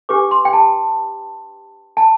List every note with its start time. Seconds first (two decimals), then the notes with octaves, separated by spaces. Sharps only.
0.09 D4 G4 B4 D6
0.31 C6
0.45 G5
0.53 A5
1.97 A5